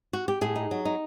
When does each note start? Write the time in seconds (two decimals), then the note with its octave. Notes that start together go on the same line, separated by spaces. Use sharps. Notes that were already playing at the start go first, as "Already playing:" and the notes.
0.13 F#4
0.28 G4
0.41 A2 G#4
0.56 D#4
0.71 F#3
0.85 D#4